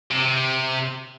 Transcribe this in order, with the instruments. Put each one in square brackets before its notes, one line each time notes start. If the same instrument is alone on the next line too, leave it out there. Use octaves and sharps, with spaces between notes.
[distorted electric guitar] C3